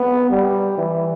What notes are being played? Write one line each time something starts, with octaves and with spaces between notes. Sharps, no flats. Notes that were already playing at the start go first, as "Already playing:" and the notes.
Already playing: B3
G3
E3